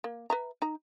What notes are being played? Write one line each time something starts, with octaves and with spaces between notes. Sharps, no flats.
A#3
B4 E5 A#5
D#4 A#5